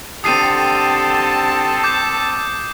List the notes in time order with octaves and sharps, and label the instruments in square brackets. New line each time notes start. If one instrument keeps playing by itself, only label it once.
[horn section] D3 G4 [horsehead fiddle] C4 A5 [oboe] A4 [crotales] D#6 C7 D#7
[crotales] D6 G6